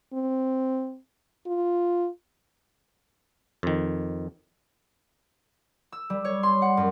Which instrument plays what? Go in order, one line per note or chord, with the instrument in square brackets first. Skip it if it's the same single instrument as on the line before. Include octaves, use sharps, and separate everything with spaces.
[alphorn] C4
F4
[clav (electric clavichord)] F2 D#3
[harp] E6
G3
C#5
C6
F#5
F#2